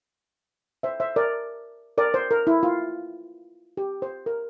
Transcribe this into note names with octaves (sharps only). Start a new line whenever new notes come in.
C5 E5
C5 E5
A#4 D5
A#4 D5
C5
A#4
E4
F4
G4
C5
A#4